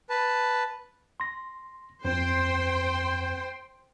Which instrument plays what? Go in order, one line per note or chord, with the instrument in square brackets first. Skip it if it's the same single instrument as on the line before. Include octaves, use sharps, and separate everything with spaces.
[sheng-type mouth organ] B4 A5
[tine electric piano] C6 A#6
[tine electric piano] F2 C4 [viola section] C5 G5 C6